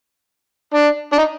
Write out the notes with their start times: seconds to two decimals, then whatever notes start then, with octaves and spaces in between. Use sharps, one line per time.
0.74 D4
1.12 D4
1.18 D#4